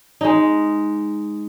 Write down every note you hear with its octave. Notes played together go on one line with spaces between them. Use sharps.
G#3 D#4